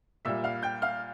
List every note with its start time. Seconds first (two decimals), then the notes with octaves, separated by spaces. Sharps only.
0.25 A#2 G3 E5 E6
0.44 F5 F6
0.63 G5 G6
0.82 F5 F6